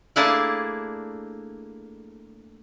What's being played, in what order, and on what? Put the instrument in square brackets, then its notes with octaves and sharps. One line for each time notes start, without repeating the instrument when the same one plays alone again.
[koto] A3 A#3 D4 E4 G#4 A5